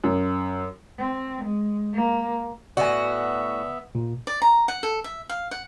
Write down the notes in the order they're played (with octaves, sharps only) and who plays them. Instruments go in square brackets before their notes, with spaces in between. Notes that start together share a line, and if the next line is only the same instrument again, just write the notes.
[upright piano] F#2
[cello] C4
G#3
A#3
[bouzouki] A2 F#4 [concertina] B3 E5 [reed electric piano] D5 F#5 G#5
[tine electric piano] A#2
[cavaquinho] D5
A#5
F#5
A4
E5
F5
F#5